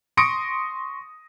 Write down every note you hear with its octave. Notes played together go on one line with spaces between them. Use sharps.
C6 C#6 D#6 A#6 C#7 D7